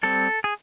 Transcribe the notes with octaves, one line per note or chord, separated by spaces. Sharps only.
G3 C4 A4
G#4